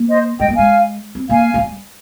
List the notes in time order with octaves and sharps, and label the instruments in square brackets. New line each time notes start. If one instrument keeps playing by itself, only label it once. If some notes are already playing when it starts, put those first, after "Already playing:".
Already playing: [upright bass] A#3
[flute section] C5 D#5
[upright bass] G#3 [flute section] D#5 G5
[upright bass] A#3
[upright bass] G#3 [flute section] F5 G#5
[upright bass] C4
[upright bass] A#3 [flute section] F5 G#5
[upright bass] G#3
G3